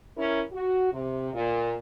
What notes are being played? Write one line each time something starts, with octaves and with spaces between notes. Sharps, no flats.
C#4 E4 A#4
F#4
C3
A#2